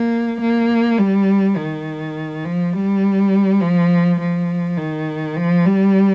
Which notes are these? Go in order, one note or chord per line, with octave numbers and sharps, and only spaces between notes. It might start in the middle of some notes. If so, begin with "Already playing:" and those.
Already playing: A#3
A#3
G3
D#3
F3
G3
F3
F3
D#3
F3
G3